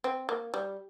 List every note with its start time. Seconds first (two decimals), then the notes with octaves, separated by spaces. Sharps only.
0.04 C4
0.29 A#3
0.54 G3